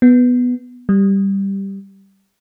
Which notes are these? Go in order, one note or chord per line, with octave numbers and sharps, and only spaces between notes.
B3
G3